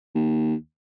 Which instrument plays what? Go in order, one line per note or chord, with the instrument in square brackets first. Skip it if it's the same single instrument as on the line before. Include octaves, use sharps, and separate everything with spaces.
[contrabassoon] D#2